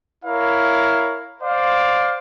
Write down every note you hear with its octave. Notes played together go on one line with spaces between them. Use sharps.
E4 A#4 C#5 F5
C5 D5 F5